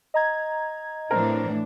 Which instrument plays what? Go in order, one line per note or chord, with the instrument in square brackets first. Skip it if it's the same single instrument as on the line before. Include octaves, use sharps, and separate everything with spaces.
[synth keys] D#5 A#5 G#6
[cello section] A2 E3 D4 [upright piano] C4 A#4